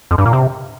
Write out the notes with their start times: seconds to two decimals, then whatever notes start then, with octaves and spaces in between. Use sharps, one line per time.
0.11 F2
0.18 G2
0.26 A#2
0.33 C3